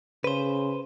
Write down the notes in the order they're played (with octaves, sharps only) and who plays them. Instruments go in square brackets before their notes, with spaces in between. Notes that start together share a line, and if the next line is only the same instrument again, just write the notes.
[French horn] C#3 [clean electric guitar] B4 C5